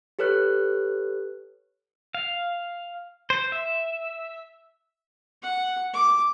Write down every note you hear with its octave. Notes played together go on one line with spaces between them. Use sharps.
G4 A4 B4 C#5 F#6
F5
C5
E5
F#5
D6